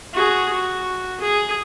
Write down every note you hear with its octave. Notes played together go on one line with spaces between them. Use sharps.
F#4 G#4
F#4
G#4